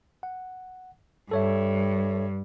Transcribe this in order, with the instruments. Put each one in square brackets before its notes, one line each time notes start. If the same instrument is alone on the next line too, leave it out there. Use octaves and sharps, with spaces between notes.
[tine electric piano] F#5
[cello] G2 [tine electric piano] A4 C#5 E5